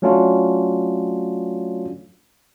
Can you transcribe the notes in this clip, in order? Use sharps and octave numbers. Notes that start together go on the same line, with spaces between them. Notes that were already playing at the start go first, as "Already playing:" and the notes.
F#3 A3 C#4 D4 F4 F#4